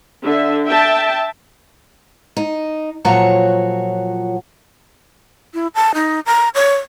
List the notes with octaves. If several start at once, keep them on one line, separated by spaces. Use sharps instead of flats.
D3 E5
E5 G5 A5
D#4
A#2 F3 F#3 F#4 C#5 A#5
E4
A5
D#4
A#5
C#5